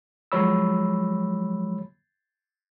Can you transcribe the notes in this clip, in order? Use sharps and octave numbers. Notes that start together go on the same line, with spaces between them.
F3 F#3 G#3 C#5 B5 E6